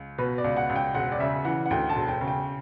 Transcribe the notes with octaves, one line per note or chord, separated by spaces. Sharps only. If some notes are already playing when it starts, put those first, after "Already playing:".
Already playing: C#2
B2 B4
D5
C#2
F#5
C#2
G5
E1 F#5
D5
C#3 E5
E3 F#5
F#5
D2 G5
A5
E1
G5
C#3
G5